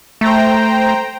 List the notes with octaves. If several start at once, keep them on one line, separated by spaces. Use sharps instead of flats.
A3 C5 G5 A#5